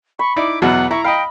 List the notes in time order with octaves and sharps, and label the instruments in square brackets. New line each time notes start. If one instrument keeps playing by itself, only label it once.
[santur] B5 [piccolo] C#6
[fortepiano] D#4 E4 D5 [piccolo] D6
[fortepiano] E2 B2 F#3 [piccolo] F#5
[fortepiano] E4 [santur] A#5 [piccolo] C#6
[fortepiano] D#5 F5 [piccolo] G5 [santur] B5